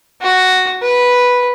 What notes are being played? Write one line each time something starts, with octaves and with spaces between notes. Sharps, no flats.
F#4
B4